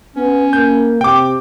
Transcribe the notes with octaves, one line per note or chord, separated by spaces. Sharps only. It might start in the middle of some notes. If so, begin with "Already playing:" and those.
B3 C#4
A#3 G6
C3 G5 D6